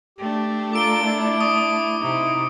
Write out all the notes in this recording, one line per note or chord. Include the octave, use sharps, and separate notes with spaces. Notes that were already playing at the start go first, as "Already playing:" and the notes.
A3 D4 G4
F4 A4 A#4 D6 D7 G7
E4
C#6 D#6
C3 D#4 E4